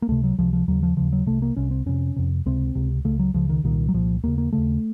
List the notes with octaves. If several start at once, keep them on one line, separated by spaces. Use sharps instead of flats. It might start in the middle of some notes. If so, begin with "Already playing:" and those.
A#3
C#2 C3 A3
F#3
C#2 C3 F3
F3
D#2 C#3 F#3
F3
D#2 C#3 F3
F#3
C2 C3 A3
A#3
C2 C3 C#4
C4
F2 C3 C#4
F2 C3
C#2 C3 C4
C#2 C3
C#2 C#3 A3
F#3
C#2 C#3 F3
D#3
C2 A#2 D#3
F#3
C2 A#2 F3
D#2 C#3 A#3
A#3
D#2 C#3 A3